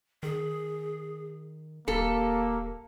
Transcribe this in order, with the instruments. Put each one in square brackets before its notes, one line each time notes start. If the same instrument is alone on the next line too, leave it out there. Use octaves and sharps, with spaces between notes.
[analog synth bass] D#3 [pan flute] G#4
[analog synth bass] D#1 [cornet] A#3 [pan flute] G4 [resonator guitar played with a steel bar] A4